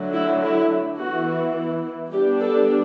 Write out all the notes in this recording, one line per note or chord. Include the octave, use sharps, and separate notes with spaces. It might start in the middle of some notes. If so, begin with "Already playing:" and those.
Already playing: D3 F#3 A3
E4
E4
E3 B3 E4 F#4
G3 B3 D4 G4
A4